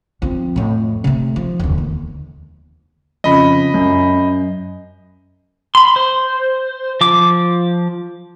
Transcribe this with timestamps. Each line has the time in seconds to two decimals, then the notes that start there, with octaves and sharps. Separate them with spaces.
0.22 F3 C4
0.56 F2 A2
1.04 C3 A3
1.36 F3
1.60 E1 D2
1.78 D#2
3.24 F2 C#3 D#5 B5
3.74 F#2
5.75 B5 C6
5.96 C5
7.01 F3 D6